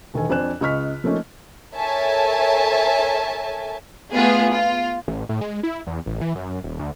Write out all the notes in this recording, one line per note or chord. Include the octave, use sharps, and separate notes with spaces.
E1 D#3 A4 G#5
F2 D4 C5 G#5 F#6 E7
C#2 D#5 C#6 F6 B6
F3 A3 A#3 C#4 D#4
A4 A#4 C#5 E5 G#5 A5
A3 B3 F4 G#4
F4
A1
A2
G#3
E4
E2
A1
E3
F#2
D#1
D2